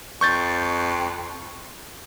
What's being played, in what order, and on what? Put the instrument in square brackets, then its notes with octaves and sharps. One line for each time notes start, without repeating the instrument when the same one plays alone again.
[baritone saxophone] F2 [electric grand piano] C#6 G6 A6